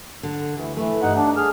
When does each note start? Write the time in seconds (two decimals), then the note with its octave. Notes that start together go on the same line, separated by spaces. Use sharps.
0.23 D3
0.57 D2 E3
0.77 E3 A3
1.02 G2 D#4 F#5
1.16 D4
1.37 G#4 F6